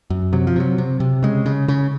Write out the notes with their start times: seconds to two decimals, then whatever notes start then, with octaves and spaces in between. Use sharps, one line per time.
0.10 F#2
0.33 C3 F#3
0.47 F3
0.56 C3 F#3
0.78 C3
1.00 C3
1.23 C#3 G#3
1.46 C#3
1.68 C#3